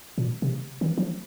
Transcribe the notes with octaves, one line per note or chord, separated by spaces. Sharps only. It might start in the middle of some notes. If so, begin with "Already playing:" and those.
A#2
C3
D#3
F3